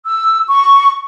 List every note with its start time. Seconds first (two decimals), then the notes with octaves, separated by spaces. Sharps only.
0.06 E6
0.47 C#6